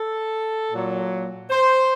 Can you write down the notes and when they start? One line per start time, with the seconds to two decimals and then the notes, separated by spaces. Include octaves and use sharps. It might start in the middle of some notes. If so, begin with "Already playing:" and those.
Already playing: A4
0.71 A#2 F#3
1.50 C5